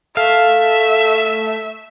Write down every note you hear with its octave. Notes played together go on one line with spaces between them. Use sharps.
A3 E5 F5